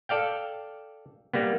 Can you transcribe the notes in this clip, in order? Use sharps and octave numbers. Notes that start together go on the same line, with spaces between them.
A4 D5 F5 G5
G3 A#3 B3